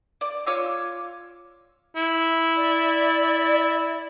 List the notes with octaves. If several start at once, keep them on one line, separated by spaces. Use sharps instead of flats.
D5
F4 C#5 D6 E6
E4
D5